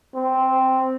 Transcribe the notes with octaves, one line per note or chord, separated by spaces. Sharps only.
C4